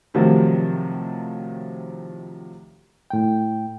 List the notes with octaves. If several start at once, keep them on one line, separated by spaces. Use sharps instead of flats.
A2 C3 D#3 F3 F#3
A2 G5